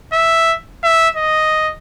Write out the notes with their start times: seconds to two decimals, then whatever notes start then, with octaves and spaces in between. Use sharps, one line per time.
0.13 E5
0.83 E5
1.16 D#5